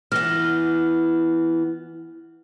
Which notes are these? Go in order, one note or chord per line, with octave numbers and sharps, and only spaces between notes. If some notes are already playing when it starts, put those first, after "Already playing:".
E3 B3 F6 A#6 G7